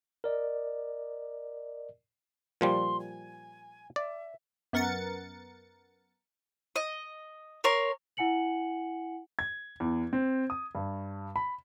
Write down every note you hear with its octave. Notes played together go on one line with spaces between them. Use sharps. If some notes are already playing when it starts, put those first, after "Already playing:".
A#4 D5 D#5
A#2 F3 G3 C6
G#5
D5 E5
F#2 B3 A#4 F#5 A6 C#7
D#5
A#4 C#5 C6
E4 F#5 G#5 C#7 F#7
G#6
E2
C4
D#6
G2
B5